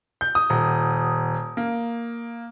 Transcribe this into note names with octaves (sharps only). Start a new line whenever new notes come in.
G6
D#6
D#1
A#3